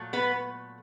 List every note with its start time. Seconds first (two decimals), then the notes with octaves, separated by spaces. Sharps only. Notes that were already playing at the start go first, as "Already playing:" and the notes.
Already playing: A#2 F#3 A3
0.13 B3 B4